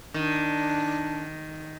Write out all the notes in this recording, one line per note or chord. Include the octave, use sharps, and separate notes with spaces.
D#3 D4